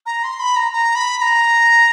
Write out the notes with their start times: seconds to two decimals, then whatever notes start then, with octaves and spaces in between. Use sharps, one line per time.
0.06 A#5
0.24 C6
0.40 B5
0.56 A#5
0.73 A#5
0.95 B5
1.18 B5
1.21 A#5